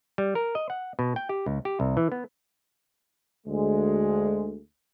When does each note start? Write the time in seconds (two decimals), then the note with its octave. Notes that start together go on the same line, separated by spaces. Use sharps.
0.18 G3
0.35 A#4
0.55 D#5
0.70 F#5
0.99 B2
1.16 G5
1.29 G4
1.46 C#2
1.65 G4
1.80 C2
1.97 E3
2.12 B3
3.46 D2 G#3